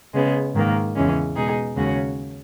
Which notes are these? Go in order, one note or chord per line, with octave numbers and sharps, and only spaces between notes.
C#3 G#3 B3
G#2 D#3 A#3
E2 C#3 E3 G#3 C#4
B2 G#3 D#4 G#4
D#2 C#3 G#3 C#4 F#4